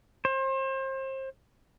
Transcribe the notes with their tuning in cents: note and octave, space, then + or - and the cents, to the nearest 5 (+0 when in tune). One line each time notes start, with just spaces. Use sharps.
C5 +35